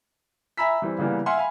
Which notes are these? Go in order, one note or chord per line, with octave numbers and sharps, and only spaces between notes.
E5 G#5 A#5 B5 E6 B6
E3 G3 C4
C#3 E3 G3 A#3 B3
E5 F#5 G#5 C6 F6
F5 G#5 B5